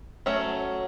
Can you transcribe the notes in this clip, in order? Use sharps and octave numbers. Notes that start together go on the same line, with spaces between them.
F#3 A3 C#4